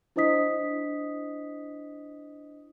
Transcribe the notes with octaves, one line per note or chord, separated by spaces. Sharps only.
D4 E4 C5 D#5 D#6 B6